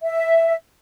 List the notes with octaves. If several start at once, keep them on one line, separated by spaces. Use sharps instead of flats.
E5